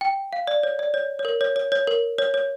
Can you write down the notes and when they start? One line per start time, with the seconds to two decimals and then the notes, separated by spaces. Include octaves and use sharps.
0.01 G5
0.33 F5
0.47 D5
0.63 C#5
0.79 D5
0.94 C#5
1.19 C#5
1.25 A#4
1.41 C#5
1.56 C#5
1.72 C#5
1.87 A#4
2.18 C#5
2.34 C#5